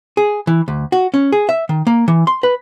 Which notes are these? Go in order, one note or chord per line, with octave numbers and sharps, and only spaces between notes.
G#4
E3
D2
F#4
C#4
G#4
E5
D#3
A#3
E3
C6
B4